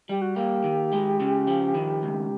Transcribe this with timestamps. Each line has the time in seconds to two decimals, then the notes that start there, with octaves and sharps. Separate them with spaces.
0.09 G3 G4
0.21 F#4
0.36 A#3 G4
0.64 D#3
0.93 G#3
1.20 C#3
1.47 F3
1.75 D#3
2.03 C#2